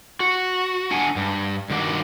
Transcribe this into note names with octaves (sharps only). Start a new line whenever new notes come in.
F#4
D4 F#5 G#5
G2
G2 D#3 F#4 D5